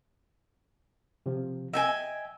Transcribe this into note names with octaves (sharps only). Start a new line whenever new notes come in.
C3 F3
D#5 E5 G5 G#5